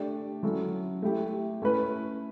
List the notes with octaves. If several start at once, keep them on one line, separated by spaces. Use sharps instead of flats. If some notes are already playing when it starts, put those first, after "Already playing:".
Already playing: A3 D4 G4 D5
F#3 C#4 E4 A4
A3 E4 G4
A3 C#4 E4 B4